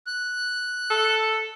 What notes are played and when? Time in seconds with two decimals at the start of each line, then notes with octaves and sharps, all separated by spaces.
0.07 F#6
0.90 A4